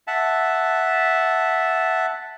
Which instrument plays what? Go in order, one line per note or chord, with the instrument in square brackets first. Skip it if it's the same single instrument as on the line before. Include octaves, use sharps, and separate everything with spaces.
[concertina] E5 F#5 A5